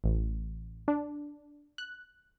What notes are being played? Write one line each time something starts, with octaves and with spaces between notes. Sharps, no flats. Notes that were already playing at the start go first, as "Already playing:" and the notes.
A1
D4
F#6